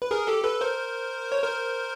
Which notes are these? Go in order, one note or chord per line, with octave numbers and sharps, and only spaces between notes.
B4
G#4 A#4
G4 A4
A4 B4
A#4 C5
C#5
A#4 C5